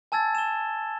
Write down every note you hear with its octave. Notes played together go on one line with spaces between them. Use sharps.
G#5 A5 E6 G#6 A6
E7 G7